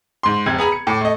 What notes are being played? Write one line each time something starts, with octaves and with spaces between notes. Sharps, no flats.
G#2 C6
F1 C3 G#6
B3 G#4 A#5 B5
C#7
A2 D6
A3 D#5